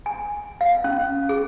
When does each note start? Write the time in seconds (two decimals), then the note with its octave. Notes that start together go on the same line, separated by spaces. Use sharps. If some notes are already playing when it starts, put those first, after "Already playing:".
0.06 G#5
0.61 F5
0.84 C#4
1.29 G#4